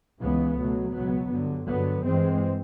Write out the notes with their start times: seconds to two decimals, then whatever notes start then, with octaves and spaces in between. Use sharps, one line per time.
0.20 C#2 C#3 E3 G#3 B3
0.56 B2 F#3 A3
0.93 C#2 B2 F#3 B3
1.30 G2 D3 F#3
1.67 G2 D3 F#3 B3
2.04 G2 E3 G#3 C4